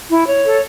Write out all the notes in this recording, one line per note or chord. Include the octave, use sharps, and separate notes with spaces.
E4
C#5
A4